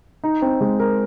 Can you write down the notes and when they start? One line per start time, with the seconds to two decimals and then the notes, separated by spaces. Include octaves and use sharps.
0.24 D#4
0.42 C4
0.61 G#3
0.80 A#4